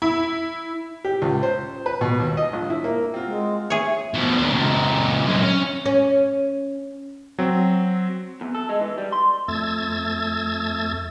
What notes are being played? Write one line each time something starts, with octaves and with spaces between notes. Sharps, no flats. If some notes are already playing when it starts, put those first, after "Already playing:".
E4
G4
C#2
C5
B4
B2
D#2
D#5
A#1
E4
A#3
C4 F4 F#4
G#3
G#4 C#5 E5
B2 F3
D#2 D4
C#2 A#2
F#2 G#3
C#4
C#4
F#3 C4
E2
A4
G#3
E3
G3
C6
F2 A3 E6 G#6 A6